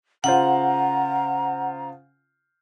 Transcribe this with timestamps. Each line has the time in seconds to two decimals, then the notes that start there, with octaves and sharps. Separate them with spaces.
0.24 C#3 F4 C5 F#5 A#5